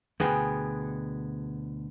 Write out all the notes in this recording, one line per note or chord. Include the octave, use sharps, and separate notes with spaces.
D2 B2 D3 B3 G#4 G5